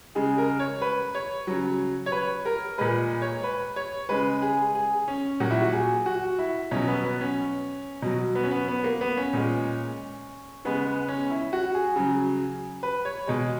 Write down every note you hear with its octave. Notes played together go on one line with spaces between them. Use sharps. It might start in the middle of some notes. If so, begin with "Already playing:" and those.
C#3 G#3 G#4
A#4
C#5
B4
C#5
C#3 F#3
C#5
B4
A#4
A#2 G#3 B4
C#5
B4
C#5
C#3 G#3 B4
G#4
G#4
C#4
A#2 F#3 F#4
E4
F#4
G#4
F#4
E4
B2 F#3 C#4
B3
B3
C#4
B2 F#3
B3
C#4
B3
B3
A#3
B3
C#4
A#2 G#3
C#3 G#3 B3
B3
C#4
E4
F#4
G#4
C#3 F#3
B4
C#5
B2 G#3